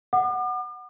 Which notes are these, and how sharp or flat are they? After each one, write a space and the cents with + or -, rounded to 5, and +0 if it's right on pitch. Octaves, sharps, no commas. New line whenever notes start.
F#5 +0 D6 +45